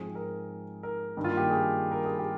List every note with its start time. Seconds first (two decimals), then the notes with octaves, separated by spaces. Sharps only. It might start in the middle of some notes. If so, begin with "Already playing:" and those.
Already playing: G#2 F3 C4 G#4
0.15 A#4
0.83 A#4
1.17 G2 D#3 G3 A#3
1.24 F4
1.37 G4
1.50 G#4
1.91 A#4
2.05 G#4
2.19 G4